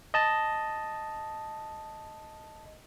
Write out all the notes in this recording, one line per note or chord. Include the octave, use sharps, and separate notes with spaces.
D#5 A5